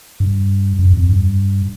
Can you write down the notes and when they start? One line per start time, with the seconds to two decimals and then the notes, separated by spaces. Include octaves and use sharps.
0.20 G2
0.79 F#2
0.93 F2
1.09 G2